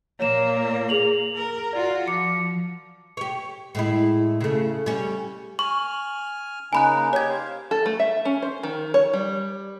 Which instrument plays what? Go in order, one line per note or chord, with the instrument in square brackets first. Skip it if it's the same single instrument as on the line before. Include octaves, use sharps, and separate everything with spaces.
[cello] A#2 A#3 [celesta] C#5 E7
[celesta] G#4 F7 F#7
[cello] A#4
[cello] F4 F#4 [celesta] D5
[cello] F3 [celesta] D6 C#7
[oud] G4 C#5
A2 G#3 E4
C#3 A3
G3 C#4
[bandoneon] G#5 F6 [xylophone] C#6
[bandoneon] C#3 A#3 D#4 [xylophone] G#5 B5 F#6
[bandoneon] G4 [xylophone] C#5 G#6
[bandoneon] C5 F5
[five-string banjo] A4
A3
E5
C#4
C5
D#3
C#5
G3